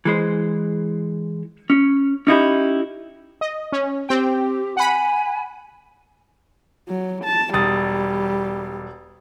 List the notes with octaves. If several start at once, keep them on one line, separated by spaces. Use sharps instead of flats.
E3 G#3 C5
C#4
C#4 D#4 E4 G4
D#5
C#4
C4 G4 G5
F#5 G#5 B5
F#3
A5
E1 G3 D#6 A6